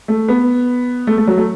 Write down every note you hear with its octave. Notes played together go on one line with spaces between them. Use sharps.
A3
B3
A3
A3
F#3
A3